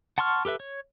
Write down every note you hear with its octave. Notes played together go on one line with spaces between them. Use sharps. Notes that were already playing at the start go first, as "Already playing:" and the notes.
F#5 A5 C6 C#6 F6
G4 A4 B4 E5
C#5